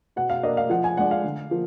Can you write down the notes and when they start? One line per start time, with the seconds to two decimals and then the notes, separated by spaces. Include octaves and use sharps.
0.16 B2 F#5
0.30 F5
0.43 A#3 D4 D#5
0.57 F5
0.70 F3 F#5
0.84 G#5
0.97 G#3 D4 F#5
1.11 F5
1.24 D3
1.51 F3 A#3